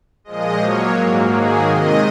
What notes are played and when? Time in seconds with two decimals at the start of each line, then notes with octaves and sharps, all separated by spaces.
0.24 A#2 F3 G#3 D#5
0.59 A#2 F#3 A#3 C#5
0.94 G#2 F#3 A#3
1.29 G#2 D#3 F#3 A#3 G#4
1.64 C3 D#3 G#3 D#5